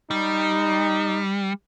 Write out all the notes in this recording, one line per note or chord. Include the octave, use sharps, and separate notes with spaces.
G3 D#4